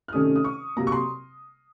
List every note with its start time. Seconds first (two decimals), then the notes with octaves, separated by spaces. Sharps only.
0.08 F6
0.13 C3 D#3 A3 C#4 D#6
0.36 D#6
0.44 C#6
0.76 C3 F#3 A#3 A#5
0.87 C#6
0.92 C6